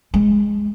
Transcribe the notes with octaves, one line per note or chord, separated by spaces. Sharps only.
G#3